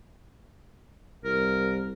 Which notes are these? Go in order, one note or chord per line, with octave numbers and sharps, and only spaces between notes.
C2 A#4